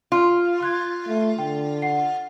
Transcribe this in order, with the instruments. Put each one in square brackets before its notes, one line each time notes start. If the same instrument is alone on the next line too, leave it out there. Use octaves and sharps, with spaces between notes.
[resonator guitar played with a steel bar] F4
[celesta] C6 F#6 G#6
[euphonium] A3
[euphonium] D3 [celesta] G5
[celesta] F#5 C7